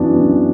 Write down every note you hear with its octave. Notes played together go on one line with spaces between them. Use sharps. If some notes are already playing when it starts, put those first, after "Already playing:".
Already playing: F#2 E3 B3 D4 F#4
F#2